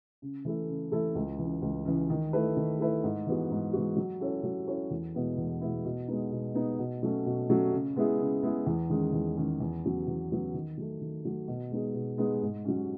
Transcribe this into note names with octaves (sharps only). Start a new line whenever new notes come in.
C#3
E3 A3 E4 A4
C#3
E3 A3 E4 A4
C#2
C#3 E3
C#2
C#3 E3
D#3
A3 E4 B4
D#3
A3 E4 B4
G#2
E3 G#3 B3 F#4
G#2
E3 G#3 B3 F#4
F#3
C#4 E4 A4 C#5
F#3
C#4 E4 A4 C#5
E2
B2 G#3 B3 E4
E2
B2 G#3 B3 E4
B2
G#3 B3 D#4
B2
G#3 B3 D#4
B2
F#3 A3 C#4
B2
F#3 A3 C#4
C#3
G#3 B3 E4 G#4
C#3
G#3 B3 E4 G#4
E2
D#3 G#3 C#4
E2
D#3 G#3 C#4
E2
C#3 F#3 B3
E2
C#3 F#3 B3
D#3
F#3 A3
D#3
F#3 A3
B2
G#3 B3 D#4 G#4
B2
G#3 B3 D#4 G#4
G#2
F#3 C#4